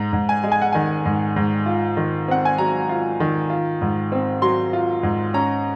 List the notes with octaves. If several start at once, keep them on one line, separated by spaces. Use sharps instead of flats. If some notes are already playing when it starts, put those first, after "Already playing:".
Already playing: G#2 A#5
G#2
G#5
G#3
G#5
F#5
D#3 G#5
G#2
G#2
F4
D#3
C4 F#5
G#5
F#3 A#5
F4
D#3
F4
G#2
C4
F#3 C6
F4
G#2
C#4 A#5